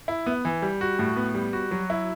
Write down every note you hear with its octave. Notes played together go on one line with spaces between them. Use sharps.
E4
B3
E3
G3
F#4
A2
B3
G3
F#4
F#3
E4